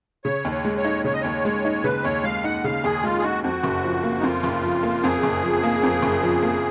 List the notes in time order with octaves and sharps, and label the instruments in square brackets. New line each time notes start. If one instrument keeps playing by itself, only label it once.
[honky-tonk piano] C#3 [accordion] C#5
[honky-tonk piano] D#2
[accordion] C#5
[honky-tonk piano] G#3
[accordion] C#5
[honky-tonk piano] D#4
[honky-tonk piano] C#3 [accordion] C#5
[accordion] D#5
[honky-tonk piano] D#2 [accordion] C#5
[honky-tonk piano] G#3
D#4
[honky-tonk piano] C#3 [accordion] B4
[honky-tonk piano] D#2 [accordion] C#5
[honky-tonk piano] G#3 [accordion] F5
[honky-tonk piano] D#4 [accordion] F#5
[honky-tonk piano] C#3 [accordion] F5
[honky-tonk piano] D#2 [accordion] G#4
[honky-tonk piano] G#3 [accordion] F4
[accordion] G#4
[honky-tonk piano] D#4 [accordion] F#4
[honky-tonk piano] F2 [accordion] F#4
[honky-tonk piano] F#1
F3
A#3
[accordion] D#4
[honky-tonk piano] F2 [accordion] F4
[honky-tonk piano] F#1
F3
A#3
[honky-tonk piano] F2 [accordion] G#4
[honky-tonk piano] F#1
F3
A#3
F2
F#1
F3
A#3